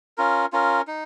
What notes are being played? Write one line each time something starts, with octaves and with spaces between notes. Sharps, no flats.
C#4 F4 A#4
C#4 F4 A#4
D#4